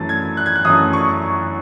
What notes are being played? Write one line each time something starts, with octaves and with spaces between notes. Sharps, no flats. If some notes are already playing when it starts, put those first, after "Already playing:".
Already playing: F#2 E3 A3 A6
G#6
F#6
G#6
F#6
F#2 E3 A3 D#6
C#6